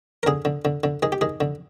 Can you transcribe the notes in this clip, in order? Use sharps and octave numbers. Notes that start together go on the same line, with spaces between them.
A#4
D3 G#4
D3
D3
D3
D#3 G#4
G4
D#3 G#4
D3